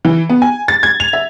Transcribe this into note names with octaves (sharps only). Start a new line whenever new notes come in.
E3
B3
G#5
A6
G#6
F7
E5